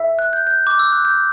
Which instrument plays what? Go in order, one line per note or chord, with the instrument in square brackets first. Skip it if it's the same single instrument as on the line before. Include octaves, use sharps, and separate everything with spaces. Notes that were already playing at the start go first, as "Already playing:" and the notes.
Already playing: [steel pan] E5
[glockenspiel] F#6
G6
G6
D6
E6
F#6
G6